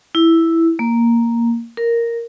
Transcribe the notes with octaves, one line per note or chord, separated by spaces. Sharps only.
E4
A#3
A#4